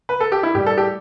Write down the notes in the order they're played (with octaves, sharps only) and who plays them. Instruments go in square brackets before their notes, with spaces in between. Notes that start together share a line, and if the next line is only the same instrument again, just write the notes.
[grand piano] B4
A4
G4
E4
A2 G3 G4
A4
G4